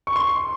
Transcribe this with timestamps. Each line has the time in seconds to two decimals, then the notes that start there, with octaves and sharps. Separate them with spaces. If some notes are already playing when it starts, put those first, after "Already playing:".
0.07 C#6
0.16 C6